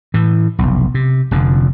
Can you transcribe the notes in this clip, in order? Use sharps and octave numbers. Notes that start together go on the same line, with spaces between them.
A2 E3
F1 B1
C3
F1 F2 D3